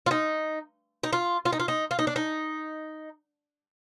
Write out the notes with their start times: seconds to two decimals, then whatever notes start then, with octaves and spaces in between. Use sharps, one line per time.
0.06 F4
0.11 D#4
1.03 D#4
1.13 F4
1.45 F4
1.53 D#4
1.60 F4
1.68 D#4
1.91 F4
1.99 D#4
2.07 D4
2.16 D#4